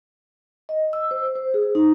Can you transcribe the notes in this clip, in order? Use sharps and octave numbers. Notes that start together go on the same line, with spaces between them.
D#5
E6
C5
C5
G#4
D#4